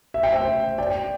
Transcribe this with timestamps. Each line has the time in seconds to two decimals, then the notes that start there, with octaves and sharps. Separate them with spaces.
0.14 E5
0.23 G5
0.32 C5 E5
0.78 D5 G5